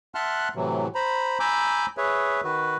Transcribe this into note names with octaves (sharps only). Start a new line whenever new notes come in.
E5 F#5 A5 C6 F6 F#6
A2 C3 E3 F#3
C5 A#5 B5
G#5 A#5 B5 D6 E6 G6
G#4 B4 C#5 E5
D#3 F#4 B4